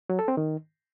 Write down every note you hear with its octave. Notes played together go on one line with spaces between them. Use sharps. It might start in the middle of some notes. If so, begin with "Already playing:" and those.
F#3
A4
C4
D#3